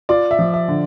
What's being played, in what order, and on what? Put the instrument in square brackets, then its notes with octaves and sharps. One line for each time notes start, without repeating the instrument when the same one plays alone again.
[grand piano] F4 [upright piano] D5
[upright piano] E5
[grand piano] F3
[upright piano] E5
[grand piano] D3